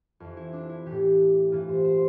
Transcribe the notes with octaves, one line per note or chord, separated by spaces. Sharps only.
F2 E3
E4
D4
E4
A2 E3 G4
G2 E3 F4
C5
C5